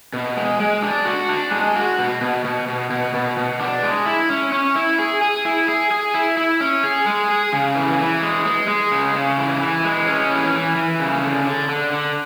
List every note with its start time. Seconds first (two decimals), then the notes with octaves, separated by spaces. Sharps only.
0.13 B2
0.37 G#3
0.60 G#3
0.82 D4
1.05 F#4
1.29 D4
1.51 G#3
1.76 F#4
1.99 B2
2.22 B2
2.45 B2
2.68 B2
2.90 B2
3.14 B2
3.37 B2
3.60 D4
3.83 G#3
4.06 E4
4.30 C#4
4.52 C#4
4.75 E4
4.99 G#4
5.22 G#4
5.45 E4
5.68 G#4
5.91 G#4
6.14 E4
6.37 E4
6.61 C#4
6.84 G#4
7.06 G#3
7.29 G#4
7.53 C#3
7.76 E3
7.99 E3
8.22 G#3
8.45 G#3
8.68 G#3
8.91 C#3
9.14 C#3
9.37 E3
9.60 E3
9.84 G#3
10.07 C#4
10.30 E3
10.54 E3
10.76 E3
11.00 C#3
11.23 D3
11.45 D3
11.69 D3
11.92 D3